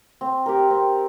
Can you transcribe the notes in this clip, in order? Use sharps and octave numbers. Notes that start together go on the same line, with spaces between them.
C4
G4 A#4
C4